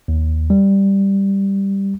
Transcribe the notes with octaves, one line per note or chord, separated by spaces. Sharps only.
D#2
G3